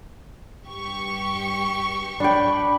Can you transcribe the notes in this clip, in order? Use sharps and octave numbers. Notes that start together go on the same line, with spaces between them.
G2 G4 C#6
D4 G5 B5